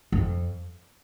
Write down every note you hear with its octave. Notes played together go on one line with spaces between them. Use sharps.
F2